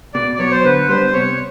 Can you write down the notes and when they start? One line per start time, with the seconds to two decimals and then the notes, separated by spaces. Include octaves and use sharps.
0.14 B2 D5
0.36 D5
0.39 F#3 B3 C#5
0.51 C5
0.64 D3 B4
0.89 G3 B3 D4 C5
1.06 C5
1.13 C3 C#5